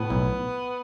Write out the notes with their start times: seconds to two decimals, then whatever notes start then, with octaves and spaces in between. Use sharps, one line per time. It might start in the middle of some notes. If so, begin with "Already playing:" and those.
Already playing: A2 B3
0.10 B1